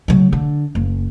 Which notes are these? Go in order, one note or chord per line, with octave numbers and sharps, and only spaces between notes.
C#3 F#3
D3
F#1